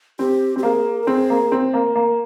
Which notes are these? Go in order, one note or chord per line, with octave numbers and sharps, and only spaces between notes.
C4 G4
C4 G4
A#3 G#4
A#4
C4 G#4
A#3
C4
A#3
A#3